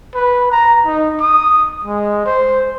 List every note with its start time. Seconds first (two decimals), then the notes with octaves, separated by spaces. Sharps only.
0.15 B4
0.51 A#5
0.86 D#4
1.20 D#6
1.85 G#3
2.26 C5